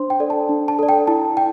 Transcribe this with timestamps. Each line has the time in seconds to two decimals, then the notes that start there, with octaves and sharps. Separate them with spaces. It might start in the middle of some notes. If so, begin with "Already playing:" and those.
Already playing: D4 C5 C6
0.10 G5
0.20 A4 D5
0.30 A5
0.49 D4
0.68 A5
0.79 A4 D5
0.89 G5
1.07 E4 A5
1.37 G5